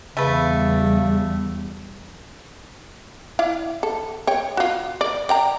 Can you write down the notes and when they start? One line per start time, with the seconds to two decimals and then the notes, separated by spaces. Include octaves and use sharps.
0.17 E2 C#3 G3 A3 B4
3.39 E4 D5 F5
3.83 A4
4.27 C#5 G5
4.57 F4 F#4
5.01 D5
5.29 D5 G5 A#5